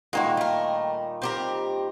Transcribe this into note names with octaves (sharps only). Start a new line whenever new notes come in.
A#2 D#3 G3 G#3 A#3 F#4
A3 A#4
C4 G4 A#4